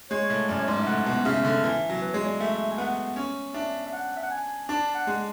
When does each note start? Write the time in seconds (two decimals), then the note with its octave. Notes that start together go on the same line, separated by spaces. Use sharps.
0.10 G#3 C#5
0.30 A2
0.49 F#2 D5
0.58 C#5
0.67 G#2 D5
0.81 E5
0.87 A2 F#5
1.06 B2
1.25 C#3 E5
1.44 D3
1.63 E3
1.89 F#3
2.01 B4
2.13 G#3 C#5
2.26 D5
2.40 A3 E5
2.71 G#5
2.77 B3 F#5
3.16 C#4
3.54 D4 E5
3.86 E5
3.92 F#5
4.16 E5
4.23 F#5
4.31 G#5
4.69 D4 A5
4.94 F#5
5.07 G#3